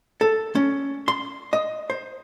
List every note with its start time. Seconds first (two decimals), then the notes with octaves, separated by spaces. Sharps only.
0.21 A4
0.55 C#4
1.08 C6
1.53 D#5
1.90 C5